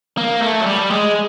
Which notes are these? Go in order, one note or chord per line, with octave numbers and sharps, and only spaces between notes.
A#3
A3
F#3
G3
G#3